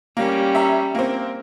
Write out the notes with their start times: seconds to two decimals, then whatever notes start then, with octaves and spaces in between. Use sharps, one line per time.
0.17 G3 A#3 C#4
0.55 E5 A#5
0.95 A#3 C4